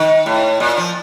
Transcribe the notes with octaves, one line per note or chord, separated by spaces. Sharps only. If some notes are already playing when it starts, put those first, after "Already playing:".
Already playing: D#3
A2
A#2
F3